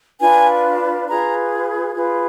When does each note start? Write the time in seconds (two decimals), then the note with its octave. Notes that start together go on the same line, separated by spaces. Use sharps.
0.21 D4 F4 B4 G#5
1.07 F4 G#4 B4 A#5
1.94 F4 G#4 B4